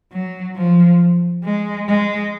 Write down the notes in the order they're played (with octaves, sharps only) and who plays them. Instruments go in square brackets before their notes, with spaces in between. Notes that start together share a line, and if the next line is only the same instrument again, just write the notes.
[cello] F#3
F3
G#3
G#3